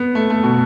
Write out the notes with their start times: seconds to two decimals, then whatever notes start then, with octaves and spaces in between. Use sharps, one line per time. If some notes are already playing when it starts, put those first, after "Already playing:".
Already playing: B3
0.15 A3
0.30 A3
0.44 B2